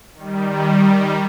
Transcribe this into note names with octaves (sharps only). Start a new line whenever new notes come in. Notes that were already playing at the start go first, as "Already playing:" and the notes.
D#3 G3